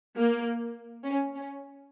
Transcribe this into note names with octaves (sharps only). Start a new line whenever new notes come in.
A#3
C#4
C#4